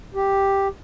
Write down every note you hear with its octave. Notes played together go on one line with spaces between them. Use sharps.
G4